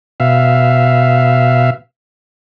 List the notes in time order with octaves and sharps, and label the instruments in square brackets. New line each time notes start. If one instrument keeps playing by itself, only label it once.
[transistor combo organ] B2 E5 F5